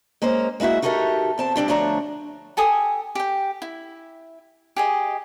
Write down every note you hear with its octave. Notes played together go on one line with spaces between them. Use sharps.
G#3 A#3 C#4 A#4 C5
G#3 A#3 E4 F#4 E5
D#4 F#4 G4 A4 A#4 E5
E2 C4 A5
G3 C4 D4 G4
D2 F3 A3 D4 C#5 A#5
G4 A4 G#5 D#6
G4 G5
E4
G4 G#4 D#5